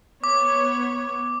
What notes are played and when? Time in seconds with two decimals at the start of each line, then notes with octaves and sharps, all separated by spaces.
0.24 B3 C#5 D6